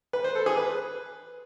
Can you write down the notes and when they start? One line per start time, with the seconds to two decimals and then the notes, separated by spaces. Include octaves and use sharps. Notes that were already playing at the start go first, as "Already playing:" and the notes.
0.13 B4
0.24 C5
0.35 A4
0.46 G#4
0.57 B4